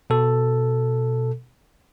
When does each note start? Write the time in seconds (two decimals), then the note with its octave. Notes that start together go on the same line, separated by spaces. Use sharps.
0.10 B2 A4